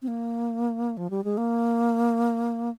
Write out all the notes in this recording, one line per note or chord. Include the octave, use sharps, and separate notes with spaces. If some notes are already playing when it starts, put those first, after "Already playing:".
C4
A#3
F3
G3
G#3
A#3